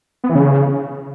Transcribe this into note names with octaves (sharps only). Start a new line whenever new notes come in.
B3
E3
C#3